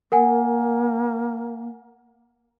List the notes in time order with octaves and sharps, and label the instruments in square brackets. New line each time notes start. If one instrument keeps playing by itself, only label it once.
[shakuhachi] A#3 [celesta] A#4 F#5 G#5